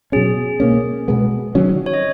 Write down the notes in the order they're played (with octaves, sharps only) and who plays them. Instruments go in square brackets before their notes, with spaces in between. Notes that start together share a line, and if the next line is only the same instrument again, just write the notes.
[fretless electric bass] B2 F#3 C#4 [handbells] G#4
[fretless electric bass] B2 A#3 C#4
B2 G#3 B3
D#3 F#3 C#4
[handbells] C#5
D#5